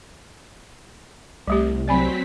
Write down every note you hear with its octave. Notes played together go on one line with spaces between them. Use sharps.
C2 G3 A3 G4
F#3 C4 D5 G#5 B5 B6